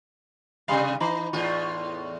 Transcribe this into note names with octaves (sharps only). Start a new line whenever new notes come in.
C3 G3 F5 B5 C6
E3 D#4 B5 D6
E2 A2 F4